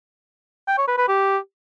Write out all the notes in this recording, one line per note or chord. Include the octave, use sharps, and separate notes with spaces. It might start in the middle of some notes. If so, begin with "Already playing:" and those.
G5
C#5
B4
B4
G4